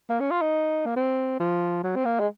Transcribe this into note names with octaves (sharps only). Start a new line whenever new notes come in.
A#3
C#4
F4
D#4
A#3
C4
F3
F#3
C4
A#3
G#3